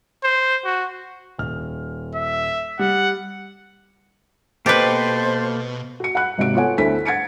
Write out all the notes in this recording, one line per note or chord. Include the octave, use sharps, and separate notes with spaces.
C5
F#4
D#1 F6
E5
G3 F#5
B2 A#3 G4 A4 B4 C5 D#5 G5
F#4 C#7
F#5 B5 F#6
G#1 C3 F#4 D7
B3 F4 A4 C#5 F#5 G#5
D2 E4 A4 C5 B6
F#5 G#6 A6 C#7 D7